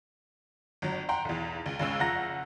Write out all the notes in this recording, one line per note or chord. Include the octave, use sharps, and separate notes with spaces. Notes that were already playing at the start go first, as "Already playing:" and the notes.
G1 F#3
F#5 G5 A#5 C6
B1 E2
C#2
C#2 C#3 G#3 C#4 E6
F#1 F3 F#5 A#5 A#6